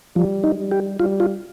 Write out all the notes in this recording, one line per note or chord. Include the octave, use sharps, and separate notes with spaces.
F3 G3
D#4
G3
G4
G3 F4
F4